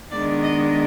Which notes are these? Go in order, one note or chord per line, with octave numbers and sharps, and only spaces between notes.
D#3 G#3 B3 D4 D5
D#5